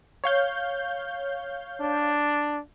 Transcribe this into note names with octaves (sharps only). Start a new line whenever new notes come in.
C#5 F5 G6
D4